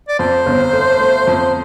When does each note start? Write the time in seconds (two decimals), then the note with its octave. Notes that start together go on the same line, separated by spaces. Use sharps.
0.08 D5
0.19 F2 C5
0.46 G1
0.73 A3
1.00 A3
1.27 F2